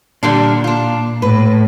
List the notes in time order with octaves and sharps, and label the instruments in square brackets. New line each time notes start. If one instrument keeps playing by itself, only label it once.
[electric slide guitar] A#2 [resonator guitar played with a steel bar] D3 G3 D4
[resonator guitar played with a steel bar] D4 F4
[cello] A2 [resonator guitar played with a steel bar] B4